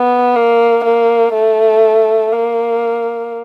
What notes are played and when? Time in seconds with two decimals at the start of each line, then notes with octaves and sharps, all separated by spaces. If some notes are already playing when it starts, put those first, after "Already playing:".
Already playing: B3
0.36 A#3
0.84 A#3
1.33 A3
2.32 A#3